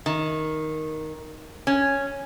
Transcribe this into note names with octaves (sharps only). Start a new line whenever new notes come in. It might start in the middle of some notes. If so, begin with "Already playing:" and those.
D#3
C#4